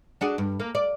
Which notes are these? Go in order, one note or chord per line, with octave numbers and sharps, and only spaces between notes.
D4 F#4 G#4
G2
A#3
D5